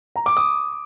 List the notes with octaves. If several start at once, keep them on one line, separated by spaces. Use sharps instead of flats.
A#5
D6
D#6